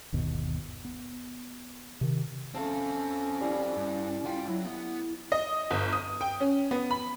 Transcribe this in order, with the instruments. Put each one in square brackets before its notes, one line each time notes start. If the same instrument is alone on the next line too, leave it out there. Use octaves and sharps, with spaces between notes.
[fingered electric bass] G1 D#2 B2
B3
C3 D#3
[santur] A3 F5 A5 [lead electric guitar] C4 A4 [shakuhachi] C#4
[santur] G3 E4 F5
[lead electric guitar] G2
[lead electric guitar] G3 G5 [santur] F4
[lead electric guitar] F#3 [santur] E4
[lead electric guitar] B3
[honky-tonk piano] D#5
G1
D#6
G5
C#4
B3
B5